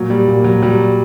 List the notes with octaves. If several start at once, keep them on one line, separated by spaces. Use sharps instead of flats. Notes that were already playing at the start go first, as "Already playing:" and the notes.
Already playing: A#2 F#3
G3
A#2
F#3
F#3 G3